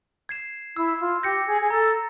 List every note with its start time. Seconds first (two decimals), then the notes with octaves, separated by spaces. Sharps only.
0.29 G#6 C7 E7
0.76 E4 E6
1.00 F4
1.23 G4 G6 A#6 C#7
1.46 G#4
1.61 G#4
1.70 A4 A#5